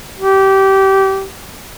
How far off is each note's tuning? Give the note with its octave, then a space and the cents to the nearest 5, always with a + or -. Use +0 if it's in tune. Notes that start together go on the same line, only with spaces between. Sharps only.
G4 -20